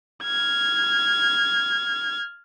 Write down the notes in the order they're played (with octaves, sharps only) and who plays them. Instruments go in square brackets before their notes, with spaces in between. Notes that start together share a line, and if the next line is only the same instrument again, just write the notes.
[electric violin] F6 G#6